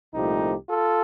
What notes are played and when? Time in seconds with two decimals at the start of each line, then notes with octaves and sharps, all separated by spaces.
0.14 C2 A#2 F3 A3 D#4 G4
0.70 F4 A4